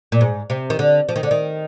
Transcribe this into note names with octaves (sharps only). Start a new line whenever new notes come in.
A#2
G#2
C3
D#3
D3
F3
D#3
D3
D#3